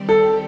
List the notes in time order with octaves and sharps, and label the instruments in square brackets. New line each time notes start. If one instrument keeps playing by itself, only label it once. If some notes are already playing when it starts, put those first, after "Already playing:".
Already playing: [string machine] D#3 G3 C4 G4 D5
[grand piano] A4